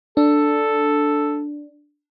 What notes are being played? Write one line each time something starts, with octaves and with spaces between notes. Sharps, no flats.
D4 A4